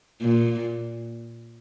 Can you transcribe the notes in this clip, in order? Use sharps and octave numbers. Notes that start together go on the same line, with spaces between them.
A#2